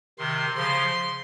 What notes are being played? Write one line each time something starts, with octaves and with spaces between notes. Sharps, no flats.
C3 D#3 C6
C#3 F3 C6